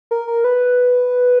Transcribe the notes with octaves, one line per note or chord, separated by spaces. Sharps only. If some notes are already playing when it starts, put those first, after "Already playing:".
A#4
A#4
B4